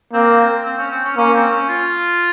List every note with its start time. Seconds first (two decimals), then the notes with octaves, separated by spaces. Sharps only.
0.13 A#3 C4
0.40 C4
0.65 C4
0.77 C#4
0.91 C4
1.05 C#4
1.17 A#3 C#4
1.34 C4
1.51 C#4
1.69 F4